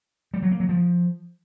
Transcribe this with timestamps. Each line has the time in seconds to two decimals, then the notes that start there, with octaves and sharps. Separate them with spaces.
0.34 G3
0.42 F#3
0.51 A#3
0.60 F#3
0.69 F3